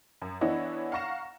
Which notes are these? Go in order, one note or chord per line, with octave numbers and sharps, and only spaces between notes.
F#2
E3 B3 D4 E4 C#5 D#5
F5 F#5 A#5 C#6 A#6 E7